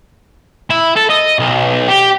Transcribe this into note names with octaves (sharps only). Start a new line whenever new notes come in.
E4
A4
D#5
B1
G4